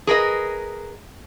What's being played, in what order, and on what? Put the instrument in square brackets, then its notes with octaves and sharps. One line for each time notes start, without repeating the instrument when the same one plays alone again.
[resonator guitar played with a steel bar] G#4 A#4 B4 D#5